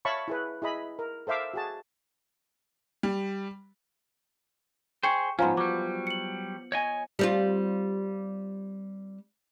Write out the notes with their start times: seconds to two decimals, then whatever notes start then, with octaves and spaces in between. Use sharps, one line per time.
0.05 C#5 E5 F5 A5 B5 C#6
0.28 E4 G#4 B4
0.62 E4 G#4 D#5 B5
0.99 A#4
1.27 A4 C5 E5 F5 D6
1.54 F#4 G#4 A5
3.03 G3
5.03 G#4 C5 G5 C#6 C#7
5.39 G#2 F3 B3 C#4 G#5 A#5 C6
5.57 F#3 G3 D6
6.07 C#7 F#7
6.72 C#5 D#5 G#5
7.19 G3 C4 F4